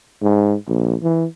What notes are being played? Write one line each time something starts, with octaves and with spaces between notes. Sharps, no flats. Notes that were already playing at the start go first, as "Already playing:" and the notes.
G#2
A#1
E3